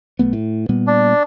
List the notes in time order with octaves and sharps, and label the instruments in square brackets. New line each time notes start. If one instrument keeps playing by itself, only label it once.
[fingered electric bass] B1 A3 B3
A2
A#2 G3 B3
[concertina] D4